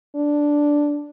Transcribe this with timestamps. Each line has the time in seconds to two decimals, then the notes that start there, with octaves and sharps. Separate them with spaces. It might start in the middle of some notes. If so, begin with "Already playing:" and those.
0.16 D4